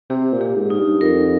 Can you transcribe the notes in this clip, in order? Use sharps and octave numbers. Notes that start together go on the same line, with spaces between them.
C3 G4
A#2
G4
G#2
D#4
G2
F2 A#4